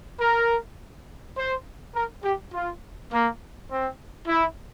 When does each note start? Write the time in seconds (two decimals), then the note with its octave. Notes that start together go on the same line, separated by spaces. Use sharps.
0.20 A#4
1.36 C5
1.95 A#4
2.24 G4
2.53 F4
3.11 A#3
3.69 C4
4.27 E4